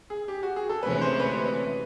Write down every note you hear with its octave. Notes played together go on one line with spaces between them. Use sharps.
G#4
G4
F#4
G#4
A4
D2 C3 E3 G#3 C#4 B4
C5
B4